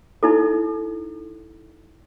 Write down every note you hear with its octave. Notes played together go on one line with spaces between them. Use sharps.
D#4 E4 A4